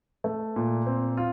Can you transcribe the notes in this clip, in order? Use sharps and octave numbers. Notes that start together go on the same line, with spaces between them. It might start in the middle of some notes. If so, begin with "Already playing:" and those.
A3
A#2
C4
F4